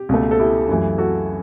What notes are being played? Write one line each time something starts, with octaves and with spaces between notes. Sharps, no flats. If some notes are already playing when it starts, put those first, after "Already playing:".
Already playing: G4
C#2 B2 A3
A4
E4 G4
F#2 E3 A3
F#4 A4